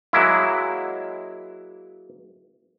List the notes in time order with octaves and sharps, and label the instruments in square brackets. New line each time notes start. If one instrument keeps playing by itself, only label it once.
[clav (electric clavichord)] F#3 G#3 A#3 E4